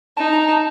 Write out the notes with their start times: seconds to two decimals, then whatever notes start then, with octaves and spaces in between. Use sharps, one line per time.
0.17 D#4 A5
0.33 A#5
0.49 A5